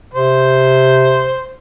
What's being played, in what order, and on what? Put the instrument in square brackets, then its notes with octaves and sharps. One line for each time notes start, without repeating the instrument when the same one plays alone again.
[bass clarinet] C3 [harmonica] C5